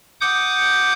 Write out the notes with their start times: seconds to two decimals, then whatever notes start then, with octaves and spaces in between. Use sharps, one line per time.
0.21 F#5 D6 D#6 G6